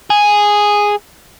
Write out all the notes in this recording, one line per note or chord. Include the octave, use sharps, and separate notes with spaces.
G#4